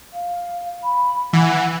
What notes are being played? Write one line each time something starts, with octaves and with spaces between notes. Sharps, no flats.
F5
B5
E3 F#5